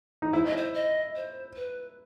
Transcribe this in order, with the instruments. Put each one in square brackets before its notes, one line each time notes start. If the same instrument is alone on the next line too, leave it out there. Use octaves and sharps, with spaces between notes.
[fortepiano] D#4
[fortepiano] E4 [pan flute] C5
[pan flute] D#5
C5
D#5
C5
B4